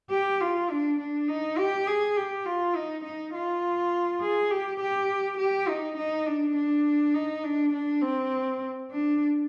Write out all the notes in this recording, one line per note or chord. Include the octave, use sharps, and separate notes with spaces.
G4
F4
D4
D4
D#4
G4
G#4
G4
F4
D#4
D#4
F4
G#4
G4
G4
G4
D#4
D#4
D4
D4
D#4
D4
D4
C4
D4